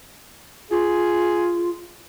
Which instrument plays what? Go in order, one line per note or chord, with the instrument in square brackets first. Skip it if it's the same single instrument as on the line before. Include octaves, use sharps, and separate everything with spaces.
[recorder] F4 [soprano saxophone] G#4